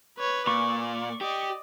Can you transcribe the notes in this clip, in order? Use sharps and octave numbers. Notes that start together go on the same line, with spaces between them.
B4 C#5
A#2 D5 C#6
G4 D5 D#5